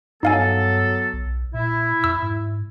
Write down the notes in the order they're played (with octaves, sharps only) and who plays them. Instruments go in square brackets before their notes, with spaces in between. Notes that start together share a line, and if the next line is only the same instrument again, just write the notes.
[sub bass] G2 [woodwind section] F#3 B3 A4 [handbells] D#4 F5 G#5
[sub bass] B1
[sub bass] A#2 [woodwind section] E4
[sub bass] F2 [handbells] E6
[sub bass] G#2